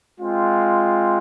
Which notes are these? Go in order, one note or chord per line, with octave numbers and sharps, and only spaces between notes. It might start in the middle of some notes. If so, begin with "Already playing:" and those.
G#3 C4 F4